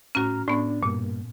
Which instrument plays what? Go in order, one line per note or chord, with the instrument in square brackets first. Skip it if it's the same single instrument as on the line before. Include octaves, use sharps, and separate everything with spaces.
[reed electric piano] A2 A#5 F6 [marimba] C#4 F#4
[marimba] A2 B3 [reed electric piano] D4
[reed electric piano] G2 A#3 [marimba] A#2